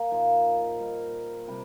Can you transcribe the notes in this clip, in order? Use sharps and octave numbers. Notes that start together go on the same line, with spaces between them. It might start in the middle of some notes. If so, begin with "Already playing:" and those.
Already playing: A#3
A#2 F3 D#4 C5
G3 D#4 A#4 D#5
C3 G3